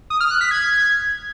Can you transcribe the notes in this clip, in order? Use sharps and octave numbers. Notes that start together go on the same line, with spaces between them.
D#6
F6
F#6
B6
G#6